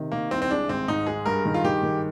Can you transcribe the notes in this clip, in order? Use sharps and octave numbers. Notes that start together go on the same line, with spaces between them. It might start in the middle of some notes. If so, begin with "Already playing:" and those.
Already playing: C3 D#3
D#3 A#3
C2 C4
C4
G#3 D4
G#1 C4
G#2 D#4
G#3 G#4
G2 A#4
D#3
F4
D#3 G4
D#3